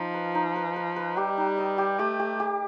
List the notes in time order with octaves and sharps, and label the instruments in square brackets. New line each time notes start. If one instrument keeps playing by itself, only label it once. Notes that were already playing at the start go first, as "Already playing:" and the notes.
Already playing: [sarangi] F3 [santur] D#4
[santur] B4
D#4
B4
B4
B4
[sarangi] G3 [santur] G4
[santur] D#4
D#5
G4
[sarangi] A3 [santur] G4
[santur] G4
G4